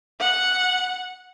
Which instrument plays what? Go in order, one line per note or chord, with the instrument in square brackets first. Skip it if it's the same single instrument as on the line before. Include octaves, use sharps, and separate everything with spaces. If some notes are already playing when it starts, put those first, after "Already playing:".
[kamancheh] F#5